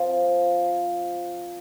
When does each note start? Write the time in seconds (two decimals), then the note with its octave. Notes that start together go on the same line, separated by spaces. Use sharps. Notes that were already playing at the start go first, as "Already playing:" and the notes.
Already playing: F3 C4 F4